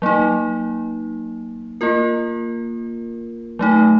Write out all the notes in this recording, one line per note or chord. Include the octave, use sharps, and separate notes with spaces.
F#3 A#3 D#4
A#3 F4 A#4
F#3 A3 D#4